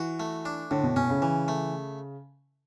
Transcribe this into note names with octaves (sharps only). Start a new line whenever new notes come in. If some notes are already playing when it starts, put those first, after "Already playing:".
Already playing: E3 F#4
A3
D4
A2 D3
B2
B2 C#4
C#3
E3
A3